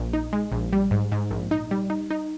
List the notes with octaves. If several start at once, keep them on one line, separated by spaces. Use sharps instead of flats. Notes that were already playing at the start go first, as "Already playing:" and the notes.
Already playing: A#1
D#4
G#3
A#1
G3
G#2
G#2
A#1
D#4
G3
D#4
D#4